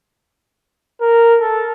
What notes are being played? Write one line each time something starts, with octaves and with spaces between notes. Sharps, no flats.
A#4
A4